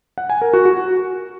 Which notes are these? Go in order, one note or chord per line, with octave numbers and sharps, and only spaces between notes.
F#5
G#5
A#4
F#4
F#4